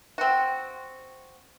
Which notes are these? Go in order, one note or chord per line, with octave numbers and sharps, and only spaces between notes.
C4 F#4